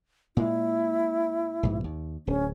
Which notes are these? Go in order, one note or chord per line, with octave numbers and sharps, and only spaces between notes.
A#2 G#3 E4
A#1 G#2 B2
D#2
D1 C#4